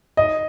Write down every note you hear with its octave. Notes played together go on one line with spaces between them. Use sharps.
D#5